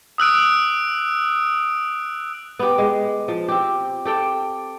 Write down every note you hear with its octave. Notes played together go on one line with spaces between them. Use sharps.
D#6 E6 F#6 D7
B3 G4
G#3
F3
C4 G4
G4 A4 G5